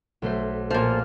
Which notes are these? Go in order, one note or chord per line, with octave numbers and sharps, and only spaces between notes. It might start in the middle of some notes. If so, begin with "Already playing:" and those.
B1 A3 C5
A#2 F3 F6